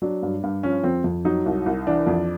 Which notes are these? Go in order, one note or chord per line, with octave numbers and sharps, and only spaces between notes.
F#3 D4
G2
G2
F3 C#4
F2 C4
F2
F#3 D#4
C2
C2
E3 D4
F2